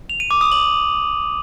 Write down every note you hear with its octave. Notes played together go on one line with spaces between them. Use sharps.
F7
D#7
D6
D#6
F#7